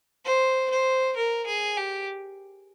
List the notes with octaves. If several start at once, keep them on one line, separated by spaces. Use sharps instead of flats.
C5
C5
A#4
G#4
G4